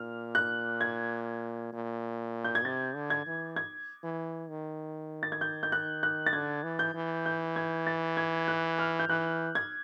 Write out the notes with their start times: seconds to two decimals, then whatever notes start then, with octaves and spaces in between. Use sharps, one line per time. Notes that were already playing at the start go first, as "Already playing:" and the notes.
Already playing: A#2 F6
0.35 F#6
0.81 G#6
1.73 A#2
2.45 G6
2.55 G#6
2.64 C3 A6
2.95 D3
3.10 G#6
3.26 E3
3.56 G#6
4.03 E3
4.49 D#3
5.23 A6
5.32 G#6
5.41 G6
5.63 G6
5.72 F#6
6.03 F#6
6.26 A6
6.33 D3 G#6
6.63 E3
6.79 G6
6.94 E3
7.26 G6
7.56 G#6
7.87 A6
8.17 G#6
8.48 F#6
8.79 F6
8.99 G6
9.09 E3 F#6
9.55 G#6